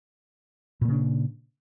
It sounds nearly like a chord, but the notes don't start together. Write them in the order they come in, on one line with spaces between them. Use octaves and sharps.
A#2 A#3 C#3 D4